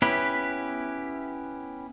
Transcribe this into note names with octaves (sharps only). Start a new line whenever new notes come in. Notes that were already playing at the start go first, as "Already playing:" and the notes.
B3 C#4 E4 G4 B4